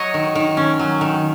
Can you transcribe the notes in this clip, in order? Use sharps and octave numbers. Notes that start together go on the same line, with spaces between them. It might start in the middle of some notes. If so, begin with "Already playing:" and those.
Already playing: F#3 C#5 D#5
D#3
D#3
C#4
F#3
D#3